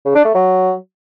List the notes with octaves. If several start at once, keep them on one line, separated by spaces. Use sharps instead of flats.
C#3
D4
A3
F#3